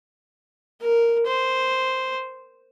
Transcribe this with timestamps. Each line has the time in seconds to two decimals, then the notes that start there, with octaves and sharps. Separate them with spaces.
0.81 A#4
1.27 C5